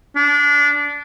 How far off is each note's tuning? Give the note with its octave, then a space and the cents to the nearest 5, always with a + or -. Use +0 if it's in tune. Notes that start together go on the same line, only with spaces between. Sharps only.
D4 -20